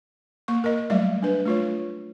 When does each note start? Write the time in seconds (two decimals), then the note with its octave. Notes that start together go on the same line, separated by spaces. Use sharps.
0.48 A#3 C#6
0.64 A#4 D#5
0.90 F#3 G3 A3 D5 E5
1.23 D4 B4
1.46 A3 F4 C#5